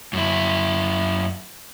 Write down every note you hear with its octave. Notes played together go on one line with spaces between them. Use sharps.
F#2 E4